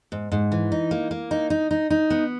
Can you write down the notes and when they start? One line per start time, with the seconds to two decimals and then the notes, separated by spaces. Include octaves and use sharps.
0.12 G#2
0.32 G#2
0.52 E3
0.72 D#4
0.91 A#3
1.11 A#3
1.31 D#4
1.50 D#4
1.71 D#4
1.90 D#4
2.10 B3